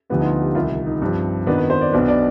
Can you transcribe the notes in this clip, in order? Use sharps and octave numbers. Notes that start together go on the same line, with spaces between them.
D2 D3 F3 B3 G4
D#4
F4
G4
C2 C3 D#3 F4
D#4
G2 F3 C4
F2 D#3 B3 D4
B4
C5
D5
B1 B2 B3 D4
D5